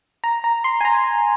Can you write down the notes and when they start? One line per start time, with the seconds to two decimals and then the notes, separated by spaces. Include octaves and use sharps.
0.24 A#5
0.44 A#5
0.64 C6
0.81 G#5
0.85 A#5